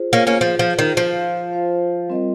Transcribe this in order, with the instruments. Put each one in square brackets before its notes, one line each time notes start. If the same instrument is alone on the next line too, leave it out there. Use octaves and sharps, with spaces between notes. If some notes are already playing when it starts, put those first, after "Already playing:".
Already playing: [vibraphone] F4 G#4 C5
[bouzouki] A#3 C#4
A#3 C#4
[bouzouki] F3 [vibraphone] F4 G#4 C5
[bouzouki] F3
D#3
[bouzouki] F3 [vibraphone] F4 C5 F5
[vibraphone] F4 C5 F5
G3 C4 F4 A#4 D#5